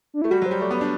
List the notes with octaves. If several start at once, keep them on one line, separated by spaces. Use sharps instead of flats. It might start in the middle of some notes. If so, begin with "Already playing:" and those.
D4
A3 E4
G3 F#4
F#3
G3 C5
A3 D5
B3
D5
D4